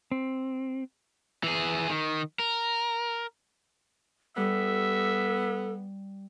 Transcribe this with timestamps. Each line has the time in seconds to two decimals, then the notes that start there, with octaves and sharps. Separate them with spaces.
0.12 C4
1.43 E3 G#4
1.89 D#3
2.39 A#4
4.37 G3 B3 A4 E5